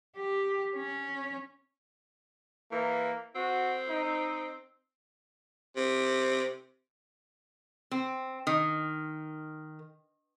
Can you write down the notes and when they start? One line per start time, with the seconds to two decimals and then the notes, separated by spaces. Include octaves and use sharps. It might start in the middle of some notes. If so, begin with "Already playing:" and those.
0.16 G4
0.75 C#4
2.71 E3 A#3
3.35 C4 F#4
3.89 D#4
5.76 C3
7.91 C4
8.47 D#3